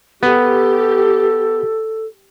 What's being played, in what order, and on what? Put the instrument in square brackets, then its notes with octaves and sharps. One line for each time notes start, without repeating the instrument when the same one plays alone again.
[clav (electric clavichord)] B3 [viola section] G4 [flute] A4